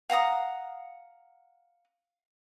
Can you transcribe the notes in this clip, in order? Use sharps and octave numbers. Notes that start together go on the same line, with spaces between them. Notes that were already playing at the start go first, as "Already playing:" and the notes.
F5 F#5 A#5 D#6